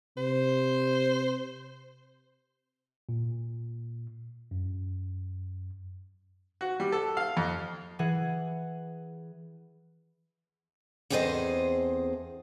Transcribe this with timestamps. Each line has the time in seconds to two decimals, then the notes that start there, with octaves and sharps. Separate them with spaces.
0.17 C3 C5
3.09 A#2
4.51 F#2
6.61 F#4
6.80 G3
6.92 A4
7.17 F5
7.37 F2
7.99 E3 G#4 F#5
11.10 E2 C4 G#4 A4 C5 D#5